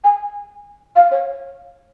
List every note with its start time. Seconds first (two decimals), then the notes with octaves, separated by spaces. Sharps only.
0.04 G#5
0.96 F5
1.11 C#5